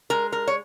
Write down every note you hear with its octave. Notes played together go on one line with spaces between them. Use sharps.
G#3 A#4
A#4
C#5